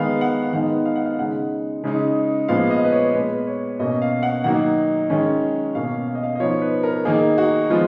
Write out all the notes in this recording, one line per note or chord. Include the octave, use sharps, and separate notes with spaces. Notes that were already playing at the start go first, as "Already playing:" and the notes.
Already playing: D#3 G#3 B3 F5
F#5
F5
D#3 G#3 B3 D#4 F#5
F5
F#5
F5
C#3 G#3 D#4 F#5
C#3 G#3 D#4
A#2 F3 G#3 B3 F5
D#5
B4
C#5
A#2 G#3 B3 B4
C#5
B2 A#3 C#4 D#5
F5
F#5
D#3 F#3 A#3 D#4 F#5
D#3 G#3 C#4
B2 A#3 C#4 F5
F5
D#5
F5
D#5
F3 B3 D#4 C#5
B4
A#4
D#3 A#3 D#4 G#4
F#4
F3 G#3 B3 F4